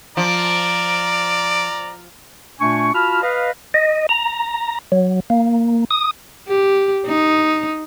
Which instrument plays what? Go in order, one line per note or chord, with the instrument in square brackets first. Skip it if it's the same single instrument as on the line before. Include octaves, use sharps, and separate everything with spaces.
[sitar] F3 [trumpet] D5 [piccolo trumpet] A#5 [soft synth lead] D7
[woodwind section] A#2 A3 D4 G#5 C#6
F4 F#4 A5 B5 F6
B4 D#5 F5
[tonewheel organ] D#5
A#5
F#3
A#3
D#6
[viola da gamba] G4
D#4